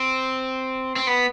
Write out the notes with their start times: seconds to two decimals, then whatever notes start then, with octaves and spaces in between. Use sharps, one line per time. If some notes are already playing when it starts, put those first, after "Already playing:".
Already playing: C4
0.96 C4
1.07 B3